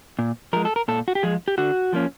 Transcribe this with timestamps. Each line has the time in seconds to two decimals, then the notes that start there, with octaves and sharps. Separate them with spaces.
0.19 A#2
0.53 F3 G#3 A#4
0.65 A4
0.76 A#4
0.88 A#2 A4
1.08 F#4
1.15 G4
1.23 F3 G#3 G#4
1.48 G4
1.58 D3 F#4
1.93 F3 A#3 C#4